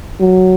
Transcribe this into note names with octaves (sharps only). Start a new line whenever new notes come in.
F#3